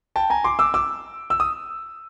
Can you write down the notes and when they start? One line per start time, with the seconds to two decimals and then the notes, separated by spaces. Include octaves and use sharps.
0.16 G5 A5
0.30 G#5 A#5
0.44 C6 D6
0.59 D6 E6
0.74 D6 E6
1.30 E6
1.40 D#6